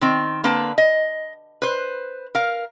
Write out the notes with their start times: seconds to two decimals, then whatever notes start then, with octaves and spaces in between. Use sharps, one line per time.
0.01 D#3 C4
0.44 D3 A#3 C4 B4 A5
0.78 D#5
1.62 B4 C5
2.35 A#4 F5